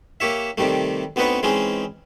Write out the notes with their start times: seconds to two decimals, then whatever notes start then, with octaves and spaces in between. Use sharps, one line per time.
0.20 A#3 G4 C#5 E5
0.58 C3 D#3 G3 A3
1.16 D2 B3 C4 D#4 B4 C#5
1.43 E3 G#3 C4 C#4 D#4 G#4